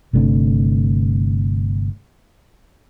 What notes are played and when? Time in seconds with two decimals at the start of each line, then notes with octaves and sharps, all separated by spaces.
0.13 G1 C3 A3 D4